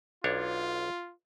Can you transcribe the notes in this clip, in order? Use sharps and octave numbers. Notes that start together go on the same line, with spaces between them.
B1 D4 F4 C#5